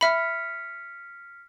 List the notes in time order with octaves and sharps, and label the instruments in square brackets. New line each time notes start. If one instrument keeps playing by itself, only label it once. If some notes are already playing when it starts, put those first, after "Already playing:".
[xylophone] E5 B5 [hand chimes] F6 B6 C#7